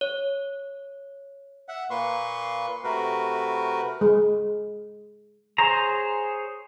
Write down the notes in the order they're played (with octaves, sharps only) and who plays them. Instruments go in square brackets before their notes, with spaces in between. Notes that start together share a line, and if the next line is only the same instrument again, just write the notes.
[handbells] C#5
[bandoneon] E5 F#5
A#2 A#3 B4 C6 C#6
C3 A3 F#4 A#4 B4
[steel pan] G#3
[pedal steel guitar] G#4 C5 C#5 A#5